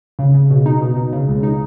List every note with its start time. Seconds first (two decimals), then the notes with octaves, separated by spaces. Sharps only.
0.19 C#3
0.34 C#3
0.50 B2
0.66 D#4
0.81 B2
0.96 B2
1.12 C#3
1.28 C#2
1.43 D#4